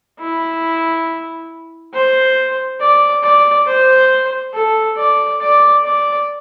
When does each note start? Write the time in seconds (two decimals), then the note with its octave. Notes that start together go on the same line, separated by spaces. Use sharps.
0.20 E4
1.93 C5
2.80 D5
3.23 D5
3.67 C5
4.54 A4
4.98 D5
5.41 D5
5.84 D5